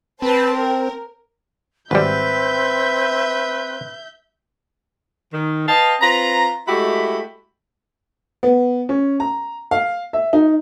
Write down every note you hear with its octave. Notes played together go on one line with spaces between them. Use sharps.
C4 B4 C5 A5
A#4
G#1 G3 C4 B4 E5 G6
D#3
B4 D#5 F5 G5 A5
C4 F4 B4 A#5
G#3 A3 E4 F#4 G4 B5
B3
C#4
A#5
F5
E5
D#4